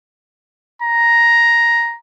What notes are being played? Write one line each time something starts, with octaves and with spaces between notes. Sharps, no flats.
A#5